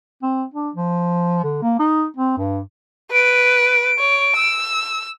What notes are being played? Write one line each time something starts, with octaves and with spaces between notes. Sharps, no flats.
C4
D4
F3
D3
A#3
D#4
C4
G2
B4 D7
C#5
E6